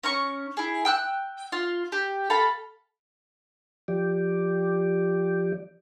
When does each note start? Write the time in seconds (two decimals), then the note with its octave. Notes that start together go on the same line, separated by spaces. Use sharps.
0.03 C#4 A#5 C#6
0.57 E4 G#4
0.85 G5 E6 F#6
1.52 F4
1.92 G4
2.30 A4 F5 B5
3.88 F3 G4 D5